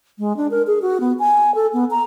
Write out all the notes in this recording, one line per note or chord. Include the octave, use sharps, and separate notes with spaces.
G#3
D4
A#4
G#4
F#4
B3
G#5
A4
B3
A#5